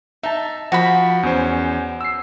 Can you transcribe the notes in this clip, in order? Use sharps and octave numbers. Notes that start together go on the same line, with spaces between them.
D#4 E5 A5
F3 F#4 B5
E2 C#4 C5
E6 C7